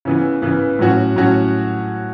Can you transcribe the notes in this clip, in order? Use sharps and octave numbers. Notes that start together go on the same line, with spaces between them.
C#3 E3 B3
C#3 E3 B3
A2 F#3 C#4 F#4
A2 F#3 C#4 F#4